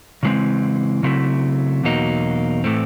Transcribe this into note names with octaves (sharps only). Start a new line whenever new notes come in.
C#3 E3 G#3 C4
C#3 F#3 A3 C4 E4
E2 B2 F#3 A#3 D#4
A2 E3 A3 C4